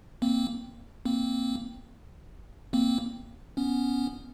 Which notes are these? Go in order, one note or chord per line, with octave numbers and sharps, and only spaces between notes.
A#3 C4
A#3 C4
A#3 C4
B3 C#4